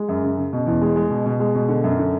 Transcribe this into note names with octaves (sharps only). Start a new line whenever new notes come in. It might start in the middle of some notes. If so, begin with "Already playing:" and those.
Already playing: G#3
F#2
C#3
C#3
B2
E2
G#3
G#3
B2
B2
G#3
B2
D3
F#2
D3